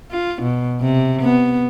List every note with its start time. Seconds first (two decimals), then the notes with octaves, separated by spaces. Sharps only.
0.11 F4
0.43 B2
0.80 C3
1.23 B3